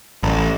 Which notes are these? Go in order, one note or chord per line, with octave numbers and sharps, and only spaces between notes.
A1